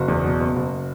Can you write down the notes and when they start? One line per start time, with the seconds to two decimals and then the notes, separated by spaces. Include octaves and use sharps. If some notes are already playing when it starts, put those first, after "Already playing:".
Already playing: F#1 F#4
0.08 E2
0.24 B2
0.40 F#1
0.56 F#1